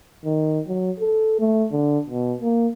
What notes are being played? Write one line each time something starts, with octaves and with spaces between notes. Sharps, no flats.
D#3
F#3
A4
A3
D3
B2
A#3